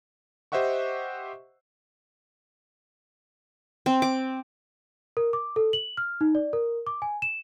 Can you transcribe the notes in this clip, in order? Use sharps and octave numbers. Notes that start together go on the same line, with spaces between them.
G4 C5 D#5 E5 F#5 C#6
C4
D6
A#4
D6
A4
F#7
F6
D#4
D5
A#4
D6
G#5
E7